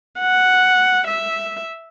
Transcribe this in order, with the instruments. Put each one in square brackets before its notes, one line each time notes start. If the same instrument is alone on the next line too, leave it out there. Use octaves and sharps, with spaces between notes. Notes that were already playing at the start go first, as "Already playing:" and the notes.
[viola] F#5
E5